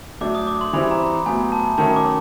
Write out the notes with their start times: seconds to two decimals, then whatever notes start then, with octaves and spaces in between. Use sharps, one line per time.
0.21 A2 F#3 A3 D4 D6
0.35 D#6
0.47 D6
0.61 C6
0.73 E3 G3 C4 E4 B5
0.91 A#5
1.26 A2 F#3 B3 G#5
1.52 A5
1.78 D#3 F#3 A3 C#4 A5
1.96 D6